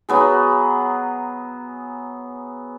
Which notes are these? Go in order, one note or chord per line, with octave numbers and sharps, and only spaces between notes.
F#3 B3 G#4